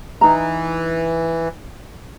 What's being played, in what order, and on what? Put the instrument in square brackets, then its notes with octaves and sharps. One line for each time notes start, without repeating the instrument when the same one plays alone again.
[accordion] E3 [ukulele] D#4 A#5